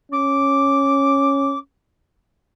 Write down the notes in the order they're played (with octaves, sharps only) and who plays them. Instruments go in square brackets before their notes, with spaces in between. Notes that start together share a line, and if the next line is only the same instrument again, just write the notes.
[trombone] C#4 [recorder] D6